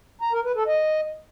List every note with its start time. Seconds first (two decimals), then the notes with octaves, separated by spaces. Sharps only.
0.21 A#5
0.33 A#4
0.44 B4
0.55 A4
0.67 D#5